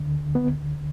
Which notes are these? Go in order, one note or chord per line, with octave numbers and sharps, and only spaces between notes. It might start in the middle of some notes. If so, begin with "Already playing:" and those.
Already playing: D2 D3
B3